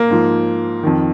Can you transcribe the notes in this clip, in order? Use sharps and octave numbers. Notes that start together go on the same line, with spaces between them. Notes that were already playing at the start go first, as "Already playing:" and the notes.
Already playing: A#3
G#2 F3
F2 D#3